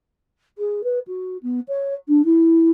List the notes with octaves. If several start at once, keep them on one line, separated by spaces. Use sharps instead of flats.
G#4
B4
F#4
B3
C#5
D4
E4